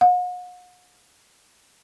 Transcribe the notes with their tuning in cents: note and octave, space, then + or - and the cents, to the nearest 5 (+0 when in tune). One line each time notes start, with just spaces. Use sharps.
F#5 -45